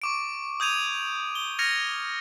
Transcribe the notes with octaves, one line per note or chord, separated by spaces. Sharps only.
C#6 D6 D7
D#6 G6 G#6 D#7 F7
G7
F6 G#6 A#6 C#7 D#7 F7